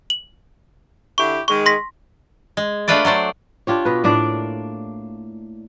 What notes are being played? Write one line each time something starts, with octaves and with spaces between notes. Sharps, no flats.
F#7
D3 E4 G4 C#6
D#3 G#3 C#6
C6 A#6 B6
G#3
A3 D4 F4 B4 C5 D5
F#3 A3 C5 D5
D4 F4 G4 C#5
B2 B4
A2 A#3 D4 D5